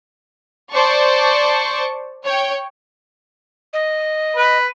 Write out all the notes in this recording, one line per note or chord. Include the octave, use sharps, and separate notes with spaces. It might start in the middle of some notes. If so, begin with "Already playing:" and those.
C5 D5 A5 C#6
C#5 G5
D#5
B4